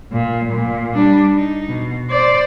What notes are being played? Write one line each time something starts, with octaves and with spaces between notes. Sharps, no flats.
A#2
A#2
G3 D4
D#4
B2
C5 D5